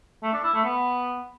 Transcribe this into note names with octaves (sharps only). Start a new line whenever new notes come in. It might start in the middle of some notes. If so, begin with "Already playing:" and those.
A3
D4
E4
A3
B3